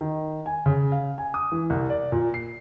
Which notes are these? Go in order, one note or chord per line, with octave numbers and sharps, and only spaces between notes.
D#3
G#5
C#3
F5
G#5
D#6
E3
C2
D5
A#2
C7